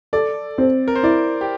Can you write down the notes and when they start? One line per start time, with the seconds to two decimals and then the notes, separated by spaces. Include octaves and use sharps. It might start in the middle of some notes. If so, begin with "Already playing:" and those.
0.13 A4 D5
0.58 C4
0.88 A#4
0.95 C5
1.03 E4 D5
1.41 G4